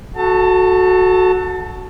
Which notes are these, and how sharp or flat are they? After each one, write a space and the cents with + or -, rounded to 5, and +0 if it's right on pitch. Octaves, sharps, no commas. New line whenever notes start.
F#4 +0 A4 -15 A5 +35